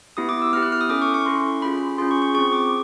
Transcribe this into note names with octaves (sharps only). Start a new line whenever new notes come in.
B3 E4 G4 D#6
D6
E6
B3 E4 G4 F6
F#6
F6
D#6
C#4 E4 A4 D6
C#6
C#6
C#4 E4 A4 C6
C#4 F4 G#4 B5
C#4 F4 G#4 C6
C#6
C#6
C4 F4 G#4 C#6
D6